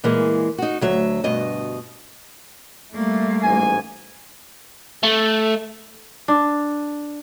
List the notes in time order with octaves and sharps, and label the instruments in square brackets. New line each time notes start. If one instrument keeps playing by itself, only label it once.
[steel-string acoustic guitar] A#2 E3 G#3 A#3
D#4 F#4
D2 F#3 E5
D2 G2 B2 D#5
[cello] G3 A#3 [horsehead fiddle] A3
[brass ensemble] A1 G#2 G#5
[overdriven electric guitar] A3
[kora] D4